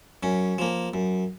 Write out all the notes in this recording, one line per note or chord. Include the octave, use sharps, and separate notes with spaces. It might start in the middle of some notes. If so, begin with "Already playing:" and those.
F#2 C#4
F3 A#3
F#2